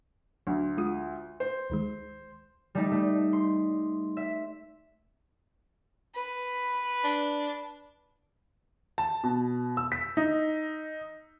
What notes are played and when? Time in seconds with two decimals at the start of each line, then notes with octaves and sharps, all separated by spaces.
0.47 D2 F#3
0.78 G#3 F4 D#6
1.40 C5
1.70 D2 D#3 G#3
2.75 G3 A3 D#4
2.91 A3
3.33 C6
4.17 E5
6.14 B4
7.04 D4
8.98 A5
9.24 B2
9.77 E6
9.92 B6
10.17 D#4